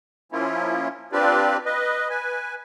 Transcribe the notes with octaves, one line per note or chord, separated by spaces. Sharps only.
F3 A#3 C#4 E4 F4
C4 D4 F4 G4 B4 D5
B4 D#5
B4 G#5